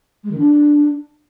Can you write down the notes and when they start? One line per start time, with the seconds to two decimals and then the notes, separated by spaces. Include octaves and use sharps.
0.24 G#3
0.31 D#3
0.38 D4